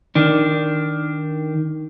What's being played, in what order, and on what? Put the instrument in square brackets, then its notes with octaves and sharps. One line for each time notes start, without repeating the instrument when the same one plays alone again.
[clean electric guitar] D#3 D4